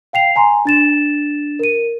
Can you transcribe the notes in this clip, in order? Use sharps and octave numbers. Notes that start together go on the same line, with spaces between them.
F5 G5 C7 F7
G#5 A#5 C6
D4 A6 E7
A#4 D#7